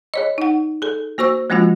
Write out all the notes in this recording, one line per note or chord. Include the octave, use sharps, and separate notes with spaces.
G#4 C#5 D#5
D#4 F#5
G#4 A4
A#3 F#4 C5 C#6 E6
F3 G#3 A#3 C#4 F4 F#4